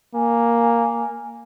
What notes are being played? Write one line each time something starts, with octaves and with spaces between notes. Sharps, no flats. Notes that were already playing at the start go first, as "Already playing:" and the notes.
A#3 G#5